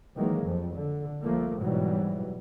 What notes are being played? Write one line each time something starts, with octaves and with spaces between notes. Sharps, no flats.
D#3 E3 F#3 G#3 A#3
F2 F3
D3
C2 F3 A3 A#3
G#2 B2 E3 F#3 G3